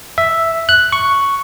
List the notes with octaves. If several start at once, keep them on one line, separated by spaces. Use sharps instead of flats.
E5
F#6
C#6